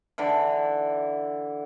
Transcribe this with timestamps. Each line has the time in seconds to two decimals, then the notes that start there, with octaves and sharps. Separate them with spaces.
0.18 D3 E3